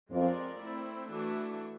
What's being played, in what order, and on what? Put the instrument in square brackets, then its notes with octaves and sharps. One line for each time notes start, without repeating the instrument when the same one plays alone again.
[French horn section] F2 [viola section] G#3 C4 F4 A#4 D5
[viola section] A3 C4 E4
E3 A3 D4 F#4